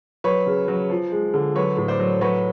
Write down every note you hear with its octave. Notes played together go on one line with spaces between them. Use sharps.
F#3 B4 C#5
C#3
F#3
F3
G#3
D3
F#3 B4 C#5
A2
C5 D5
F#3
F#3 B4 C#5